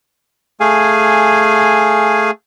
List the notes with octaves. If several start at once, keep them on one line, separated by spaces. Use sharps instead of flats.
A3 G#4 F5 G#5